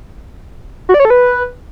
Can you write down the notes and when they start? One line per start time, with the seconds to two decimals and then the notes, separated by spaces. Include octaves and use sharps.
0.89 F#4
0.94 D5
1.00 C#5
1.05 A4
1.10 B4